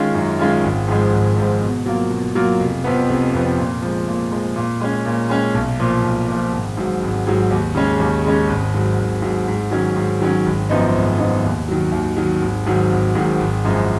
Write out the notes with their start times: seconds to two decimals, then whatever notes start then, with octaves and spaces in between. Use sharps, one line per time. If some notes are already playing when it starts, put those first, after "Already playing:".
Already playing: D#3 G#3 C#4 F4
0.14 F#2
0.39 D#3 G#3 C#4 F4
0.64 G#1
0.88 G#2 F3 G#3
1.13 G#1
1.37 G#2 F3 G#3
1.62 B2
1.86 F#3 A#3 F4
2.10 B2
2.35 F#3 A#3 F4
2.60 F1
2.84 F2 F3 B3
3.09 F1
3.33 F2 F3 B3
3.58 A#2
3.82 F3 G#3
4.08 A#2
4.32 F3 G#3
4.56 A#2
4.81 G#3 C#4
5.06 A#2
5.29 G#3 C#4
5.54 B1
5.80 A#2 F3
6.03 B1
6.28 A#2 F3
6.52 G#1
6.77 G#2 F#3
7.02 G#1
7.27 G#2 F#3
7.51 D#2
7.75 C#3 G#3 C#4
8.00 D#2
8.24 C#3 G#3 C#4
8.49 G#1
8.74 G#2 F#3
8.98 G#1
9.22 G#2 F#3
9.48 G#2
9.71 D#3 F#3 C#4
9.96 G#2
10.20 D#3 F#3 C#4
10.46 G#1
10.70 F#2 F3 B3 D#4
10.95 G#1
11.18 F#2 F3 B3 D#4
11.44 D#2
11.68 D#3 F#3
11.92 D#2
12.17 D#3 F#3
12.42 G#1
12.66 G#2 D#3 F#3
12.90 G#1
13.15 G#2 D#3 F#3
13.40 G#1
13.64 F#2 F3 G#3